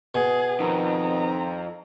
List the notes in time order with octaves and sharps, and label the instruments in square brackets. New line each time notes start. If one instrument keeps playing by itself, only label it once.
[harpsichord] B2 [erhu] G#4
[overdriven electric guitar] F2 [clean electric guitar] D#3 [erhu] A#5